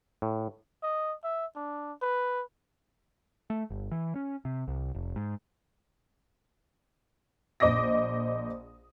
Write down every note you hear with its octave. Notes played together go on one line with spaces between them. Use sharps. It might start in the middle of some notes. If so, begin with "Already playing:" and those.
A2
D#5
E5
D4
B4
A3
G1
E3
C#4
C3
C2
F1
G#2
A#1 C5 D#5 D6 D#6 A#6